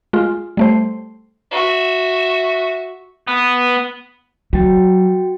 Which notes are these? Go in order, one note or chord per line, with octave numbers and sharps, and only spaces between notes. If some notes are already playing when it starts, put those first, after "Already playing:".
G#3 F4
G3 A3 C5
F#4 E5
B3
F#3 F#4 G5 A6